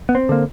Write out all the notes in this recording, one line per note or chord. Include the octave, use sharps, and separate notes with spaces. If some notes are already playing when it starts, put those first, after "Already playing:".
B3
C4
D3 A#3